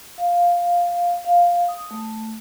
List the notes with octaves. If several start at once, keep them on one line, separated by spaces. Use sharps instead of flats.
F5
F5
D#6
A3